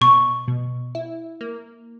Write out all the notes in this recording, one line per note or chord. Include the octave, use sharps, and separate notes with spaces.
B2 C#6
B2
E4
A#3